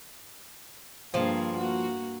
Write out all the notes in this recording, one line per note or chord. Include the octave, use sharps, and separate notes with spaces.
G2 F3 A#3 G#4
A#3 F#4